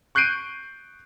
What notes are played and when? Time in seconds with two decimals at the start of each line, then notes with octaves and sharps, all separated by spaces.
0.15 C#6 F#6 G6 C7 D7 D#7